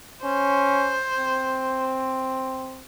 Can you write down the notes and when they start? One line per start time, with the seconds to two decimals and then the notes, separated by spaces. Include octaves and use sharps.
0.24 C#4 C5
1.17 C4